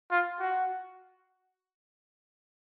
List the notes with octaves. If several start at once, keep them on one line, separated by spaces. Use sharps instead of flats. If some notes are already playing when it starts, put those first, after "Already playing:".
F4
F#4